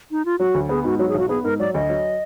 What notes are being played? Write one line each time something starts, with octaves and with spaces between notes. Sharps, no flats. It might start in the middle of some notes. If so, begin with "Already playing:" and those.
D#4
F4
F#3 F#4
D2
B3 G#4
G#2 F#4
F#3 F#4
G#4
B1 F#4
B3 G#4
G#2 A#4
F#3 D5
D2 D#5
F#3